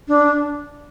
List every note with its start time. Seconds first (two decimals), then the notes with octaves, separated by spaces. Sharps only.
0.08 D4